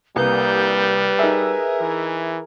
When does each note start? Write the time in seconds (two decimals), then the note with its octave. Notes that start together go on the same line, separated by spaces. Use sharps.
0.16 C2 G3 A#3 B4 G6
1.19 D#4 G#4 A#4 E5
1.81 E3